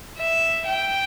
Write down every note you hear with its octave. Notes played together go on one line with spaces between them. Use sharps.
E5
G5